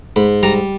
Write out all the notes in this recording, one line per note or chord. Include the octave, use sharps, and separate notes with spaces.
G#2 B5
G3 A#5